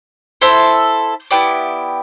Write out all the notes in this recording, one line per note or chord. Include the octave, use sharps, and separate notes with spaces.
E4 A4 C5 E5
B3 E4 G4 D5